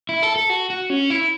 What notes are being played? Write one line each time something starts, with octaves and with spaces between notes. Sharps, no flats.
E4
A4
A4
F#4
F#4
C#4
E4